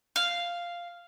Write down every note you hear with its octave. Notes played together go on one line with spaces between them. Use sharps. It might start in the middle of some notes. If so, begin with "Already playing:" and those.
F5